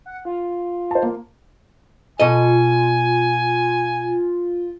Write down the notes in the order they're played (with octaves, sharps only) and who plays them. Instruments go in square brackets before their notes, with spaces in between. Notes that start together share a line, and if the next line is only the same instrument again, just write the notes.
[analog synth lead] F#5
F4
[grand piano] C5 A5
A#3
[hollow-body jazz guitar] B2 A4 D#5 [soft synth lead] F4 [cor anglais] G#5